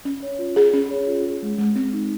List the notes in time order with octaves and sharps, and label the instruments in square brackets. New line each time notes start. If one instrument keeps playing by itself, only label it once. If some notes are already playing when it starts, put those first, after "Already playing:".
[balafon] C#4
C#5
F4
G#4
C#4
C#5
F4
G#4
G#3
G#3
C4
D#4